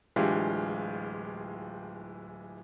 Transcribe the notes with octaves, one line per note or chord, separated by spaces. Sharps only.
D1 E3 G#3 D4 F4 G4